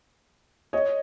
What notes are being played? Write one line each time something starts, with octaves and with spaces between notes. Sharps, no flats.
C#5 D#5